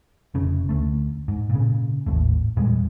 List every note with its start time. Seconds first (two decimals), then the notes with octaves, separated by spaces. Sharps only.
0.34 F1 C#3 C#4
0.69 D2 A3
1.28 G#2
1.50 A#2 C#3
2.06 G#1 D#2 A2
2.56 E2 A#2 G3 G#3